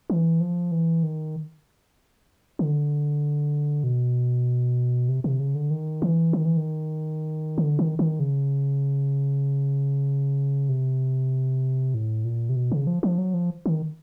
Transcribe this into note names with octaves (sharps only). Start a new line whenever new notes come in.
E3
F3
E3
D#3
D3
B2
C3
C3
C#3
D3
D#3
E3
D#3
E3
D#3
D3
D#3
D#3
C#3
C3
A2
A#2
C3
B2
C#3
F3
F3
F#3
F3
D#3